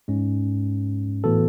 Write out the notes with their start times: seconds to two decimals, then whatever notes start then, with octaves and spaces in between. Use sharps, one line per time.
0.08 G#2 G#3 C#4
1.24 A2 E3 B3 F#4 A4